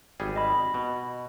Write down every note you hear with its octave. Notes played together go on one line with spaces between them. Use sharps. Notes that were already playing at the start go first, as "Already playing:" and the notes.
G#1 G3 G#4
D#5 B5
B2